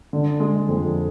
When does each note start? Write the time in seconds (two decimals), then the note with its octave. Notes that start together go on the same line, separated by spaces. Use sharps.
0.13 D3
0.40 G#3
0.69 F2